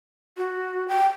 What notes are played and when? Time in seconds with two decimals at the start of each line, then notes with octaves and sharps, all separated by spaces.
0.37 F#4
0.88 G5